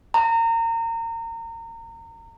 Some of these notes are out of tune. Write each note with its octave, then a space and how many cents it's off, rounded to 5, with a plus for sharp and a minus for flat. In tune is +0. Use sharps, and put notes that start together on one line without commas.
A#5 -30